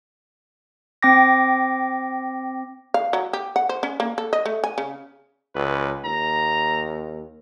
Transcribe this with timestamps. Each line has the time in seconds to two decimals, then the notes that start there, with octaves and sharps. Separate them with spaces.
1.03 C4 G5 D6 A#6
2.94 F5
3.13 F#3
3.33 G4
3.56 F#5
3.69 C5
3.83 C#4
4.00 A#3
4.18 A4
4.33 D#5
4.46 A3
4.64 G#5
4.78 C#3
5.55 C#2 B4
6.05 D#2 A#5